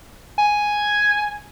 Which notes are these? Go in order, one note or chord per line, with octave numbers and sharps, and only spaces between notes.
G#5